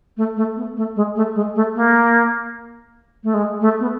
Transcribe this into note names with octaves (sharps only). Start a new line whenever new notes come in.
A3
A3
B3
A3
G#3
A3
G#3
A3
A#3
A3
G#3
A3
B3